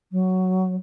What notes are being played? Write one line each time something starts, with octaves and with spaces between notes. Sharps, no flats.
F#3